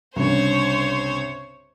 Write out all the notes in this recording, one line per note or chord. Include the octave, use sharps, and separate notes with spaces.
C2 G2 C#3 C5 C#5